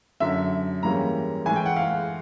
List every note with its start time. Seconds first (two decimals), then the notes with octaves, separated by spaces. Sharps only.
0.20 F#2 D3 F#3 E5
0.83 G#2 E3 G3 A#3 C#4 A#5
1.45 A2 E3 G#3 G#5
1.56 G5
1.66 F#5
1.76 F5